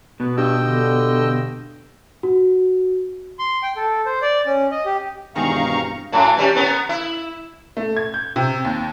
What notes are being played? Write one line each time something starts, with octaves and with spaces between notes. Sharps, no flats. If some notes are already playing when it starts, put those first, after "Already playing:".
B2 B4
G2 D#5 G5 E6
G2 D3
F#4
C6
G5
A4
C5
D5
C#4
D#5
G4
E1 G2 D#3 C4 G#4 F5 A#5 C#6
F#2 A2 F#3
E3 G3 C#4
B3 C#4 A#4
E4
A3
G#6
G6
C3
D#2